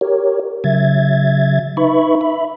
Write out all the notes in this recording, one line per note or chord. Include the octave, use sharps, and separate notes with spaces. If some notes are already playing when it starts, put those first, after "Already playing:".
G4 A#4 C#5
C#3 F#3 E5 G#6 A6
D#4 B4 E5 B5 C#6
E5 B5